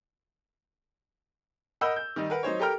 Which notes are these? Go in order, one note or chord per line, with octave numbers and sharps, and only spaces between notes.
A#4 D#5 F#5 B5 E6 G6
G6
D#3 G3 D#4
A#4 B4 F#5
F#3 D#4 C5 C#5
G4 A4 A#4 G5 A#5 F6